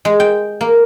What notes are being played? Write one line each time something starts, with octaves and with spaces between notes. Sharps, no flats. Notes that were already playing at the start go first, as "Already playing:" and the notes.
G#3
G5
A#3